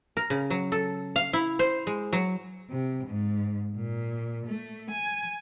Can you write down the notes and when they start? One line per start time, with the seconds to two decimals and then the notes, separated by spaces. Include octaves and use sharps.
0.17 A#4
0.30 C#3
0.50 F#3
0.72 A4
1.16 F5
1.33 E4
1.59 C5
1.87 G#3
2.13 F#3
2.70 C3
3.07 G#2
3.76 A#2
4.47 A3
4.90 G#5